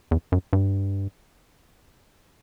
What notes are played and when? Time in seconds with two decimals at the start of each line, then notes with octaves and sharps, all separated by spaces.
0.11 E2
0.32 F#2
0.53 G2